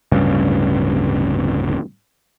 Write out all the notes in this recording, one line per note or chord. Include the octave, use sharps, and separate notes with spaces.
D1 G2 C#3